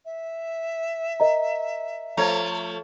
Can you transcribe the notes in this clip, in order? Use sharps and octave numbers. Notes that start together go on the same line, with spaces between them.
E5
A#4 D#5 A#5
F3 A3 C#5 A#5